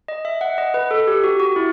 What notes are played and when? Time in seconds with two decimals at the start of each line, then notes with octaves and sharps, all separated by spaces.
0.08 D#5
0.25 E5
0.41 F#5
0.58 D#5
0.74 B4
0.91 A4
1.07 G4
1.24 F#4
1.40 F#4
1.56 E4